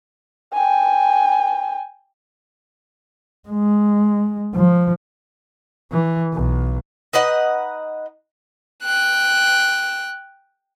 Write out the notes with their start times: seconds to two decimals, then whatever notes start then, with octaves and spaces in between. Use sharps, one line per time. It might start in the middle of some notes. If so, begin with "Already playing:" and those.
0.53 G5 G#5
3.48 G#3
4.54 F3
5.92 E3
6.33 B1
7.13 D#4 B4 D#5 F#5
8.84 G5 F#6